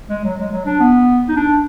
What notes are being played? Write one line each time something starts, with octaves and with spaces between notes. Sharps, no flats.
G#3
F#3
G#3
F#3
D4
B3
D#4
D4